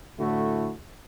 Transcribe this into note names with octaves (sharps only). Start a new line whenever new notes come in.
A2 D3 A3 E4 F#4